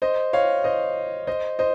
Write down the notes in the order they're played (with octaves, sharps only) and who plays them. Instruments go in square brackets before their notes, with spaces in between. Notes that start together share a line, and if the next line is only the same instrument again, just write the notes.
[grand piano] C5 D#5
C#5 F5
C5 D#5
C5 D#5
C5 D#5